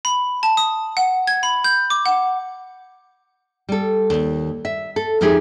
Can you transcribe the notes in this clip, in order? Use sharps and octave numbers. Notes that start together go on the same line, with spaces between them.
B5
A5
D#6
F#5
G#6
B5
G6
D6
F#5
G3 A4
D#2
E5
A4
F2 F3 D#4 G4 G#4 E5